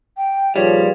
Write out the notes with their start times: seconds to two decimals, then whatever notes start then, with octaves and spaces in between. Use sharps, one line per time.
0.17 G5
0.56 D#2 A#2 F3 G3 G#4 B4 C#5 F5